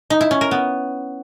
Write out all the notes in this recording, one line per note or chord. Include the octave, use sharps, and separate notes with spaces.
D#4
E4
C#4
A#4
B3